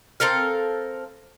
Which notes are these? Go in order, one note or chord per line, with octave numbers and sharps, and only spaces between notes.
C4 A4 A#4 F5